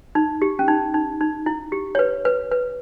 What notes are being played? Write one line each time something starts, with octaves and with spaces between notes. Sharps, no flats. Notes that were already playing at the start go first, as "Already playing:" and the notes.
D#4
G4
C#4
D#4
D#4
D#4
E4
G4
C#5
B4
B4
B4